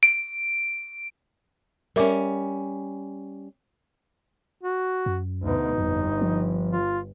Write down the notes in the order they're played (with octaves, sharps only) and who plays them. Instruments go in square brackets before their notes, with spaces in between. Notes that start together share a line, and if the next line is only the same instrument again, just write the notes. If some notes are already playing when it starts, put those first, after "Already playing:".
[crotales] D7
[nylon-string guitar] G3 C#4 [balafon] A#4 E5 D6
[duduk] F#4
[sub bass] F#2
[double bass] D2 B2 [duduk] D#4
[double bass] G1 [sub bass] F2
[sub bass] F3
[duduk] F4